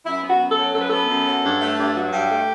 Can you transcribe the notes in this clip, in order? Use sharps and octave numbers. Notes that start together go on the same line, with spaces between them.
F#2 E4
B3
F#4
F#2
A4
F#3
F#2 A4
B4
B3 A4
F#2
F#3
G2
A3
G2
F#3
G2 G4
A3